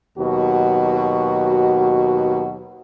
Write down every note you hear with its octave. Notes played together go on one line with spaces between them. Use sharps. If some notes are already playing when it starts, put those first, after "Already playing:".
D#2 B2 F#3 F#4